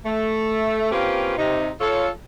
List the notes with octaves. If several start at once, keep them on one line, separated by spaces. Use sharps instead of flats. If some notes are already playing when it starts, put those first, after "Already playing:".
A3
A#3 C4 C#4 F4 G4 B4
C3 D#4
F4 A4 C#5